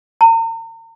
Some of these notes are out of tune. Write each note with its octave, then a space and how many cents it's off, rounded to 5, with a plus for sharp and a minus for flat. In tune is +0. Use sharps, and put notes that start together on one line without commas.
A#5 -40